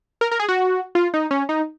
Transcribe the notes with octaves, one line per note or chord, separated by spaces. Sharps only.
A#4
A#4
G#4
F#4
F4
D#4
C#4
D#4